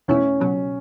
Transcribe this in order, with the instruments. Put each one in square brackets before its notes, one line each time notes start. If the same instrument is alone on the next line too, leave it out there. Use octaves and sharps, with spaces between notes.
[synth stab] E2 B2 A3 E4 [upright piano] C#4
[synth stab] C#2 B2 F#3